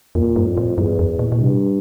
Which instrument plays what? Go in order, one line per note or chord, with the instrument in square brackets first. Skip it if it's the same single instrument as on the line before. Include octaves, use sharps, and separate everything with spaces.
[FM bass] F2 [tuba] A#2
[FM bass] G2
[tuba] F2
[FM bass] A2
[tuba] E2 [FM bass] G2
[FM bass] F2
A#2
A#2
[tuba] G2 [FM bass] C3